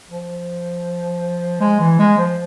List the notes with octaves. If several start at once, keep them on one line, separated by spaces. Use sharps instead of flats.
F3
G#3
E3
G#3
F3